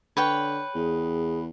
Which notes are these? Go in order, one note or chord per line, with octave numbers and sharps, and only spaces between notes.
D3 B4 C#5 G5
E2 G#4